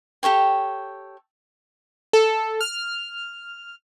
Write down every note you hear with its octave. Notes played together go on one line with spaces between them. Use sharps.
G4 A4 C#5 G5
A4
F6